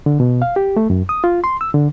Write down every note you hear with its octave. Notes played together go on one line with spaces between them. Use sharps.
D3
B2
F5
G4
A3
F#2
D#6
F4
C6
E6
D3